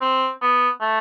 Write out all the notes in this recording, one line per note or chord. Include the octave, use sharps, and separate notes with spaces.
C4
B3
A3